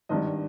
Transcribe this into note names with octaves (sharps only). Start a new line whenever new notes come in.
G#1 G2 D#3 D#5